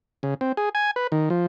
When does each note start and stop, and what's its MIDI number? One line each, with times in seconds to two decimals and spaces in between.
0.23 0.34 49
0.41 0.52 60
0.57 0.69 68
0.75 0.91 80
0.96 1.07 71
1.12 1.29 51
1.30 1.46 53